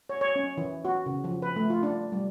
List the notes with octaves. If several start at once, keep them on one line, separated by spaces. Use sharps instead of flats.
C#5
C#5
C#4
E3
F#4
C#3
F3
B4
A3
F4
D4
G3